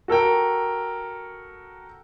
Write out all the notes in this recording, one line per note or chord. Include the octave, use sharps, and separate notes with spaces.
F#4 A4 A#4 G5